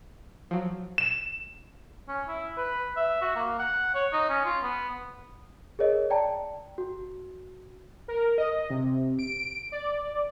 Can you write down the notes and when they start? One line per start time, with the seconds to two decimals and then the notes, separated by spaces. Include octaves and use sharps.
0.51 F3 F#3
0.98 E7
2.08 C#4
2.28 E4
2.57 B4
2.97 E5
3.22 F#4
3.36 A#3
3.59 F#5
3.95 C#5
4.13 D#4
4.30 C#4
4.45 F4
4.63 B3
5.79 G#4 A#4 C#5 D#5
6.10 D5 G5 A5 A#5
6.78 F#4
8.08 A#4
8.38 D#5
8.70 C3
9.19 D7
9.72 D5